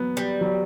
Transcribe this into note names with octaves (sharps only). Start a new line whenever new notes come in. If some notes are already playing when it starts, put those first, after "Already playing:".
Already playing: F#3 B3
G3
F#3